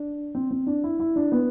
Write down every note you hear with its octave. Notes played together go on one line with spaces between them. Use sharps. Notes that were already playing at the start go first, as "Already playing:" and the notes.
Already playing: D4
C4
C4
D4
E4
E4
D4
B3